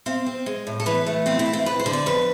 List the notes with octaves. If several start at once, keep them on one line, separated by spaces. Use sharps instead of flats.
C4 F5
C4
G#3
A2
A4
E3 B4
A3
C4 F4
E4
C4
F4
F2 B4
C5
D3
D5
F2 B4